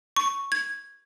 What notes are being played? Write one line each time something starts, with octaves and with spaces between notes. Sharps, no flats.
C#6
G#6